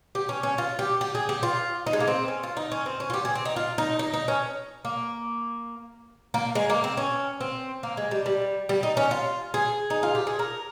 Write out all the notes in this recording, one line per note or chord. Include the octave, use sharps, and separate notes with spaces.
G4
C#4
C#4
F4
G4
G4
G#4
G4
F4
D#4
G#3
A#3
C4
C#4
F4
D#4
C#4
C4
C#4
F4
G4
G#4
C4
D#4
F4
D#4
D#4
D#4
C#4
A#3
A#3
G#3
A#3
C4
C#4
C4
A#3
G#3
G3
G3
G3
D#4
C#4
F4
G#4
D#4
F4
G4
G#4
A#4